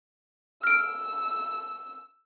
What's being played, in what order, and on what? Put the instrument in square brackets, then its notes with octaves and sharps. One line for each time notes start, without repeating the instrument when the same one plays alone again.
[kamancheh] E6 [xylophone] F6 D7